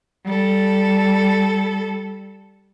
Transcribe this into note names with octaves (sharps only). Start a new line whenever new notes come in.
G3 A4